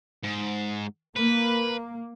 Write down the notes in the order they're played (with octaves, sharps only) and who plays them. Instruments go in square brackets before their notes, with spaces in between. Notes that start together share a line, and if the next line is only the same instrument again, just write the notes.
[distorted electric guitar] G#2
[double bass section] A#3 [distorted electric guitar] B4